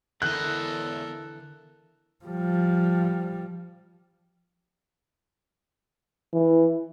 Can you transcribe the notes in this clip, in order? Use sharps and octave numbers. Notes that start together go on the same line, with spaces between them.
E2 D3 E3 E4 A4 A#4 D#5 F#6
F3 G3
E3